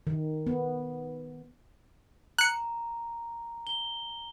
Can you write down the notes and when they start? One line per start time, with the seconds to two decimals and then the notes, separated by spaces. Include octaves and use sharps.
0.07 D#3
0.47 B3
2.38 A#5 F#6 C#7
3.67 G7